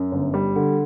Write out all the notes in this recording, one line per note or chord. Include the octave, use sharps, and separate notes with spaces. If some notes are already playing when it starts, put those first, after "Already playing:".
Already playing: F#2
G1
G3
D3